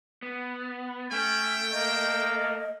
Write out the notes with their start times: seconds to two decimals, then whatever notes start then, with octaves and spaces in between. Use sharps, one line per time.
0.23 B3
1.12 A3 C#4 G5
1.72 A#3 D#5